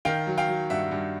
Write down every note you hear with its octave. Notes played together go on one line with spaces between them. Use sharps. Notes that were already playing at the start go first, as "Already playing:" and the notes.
D#3 F5 G5
F#3
F5 G5
F#3
G2 E5 F#5
G2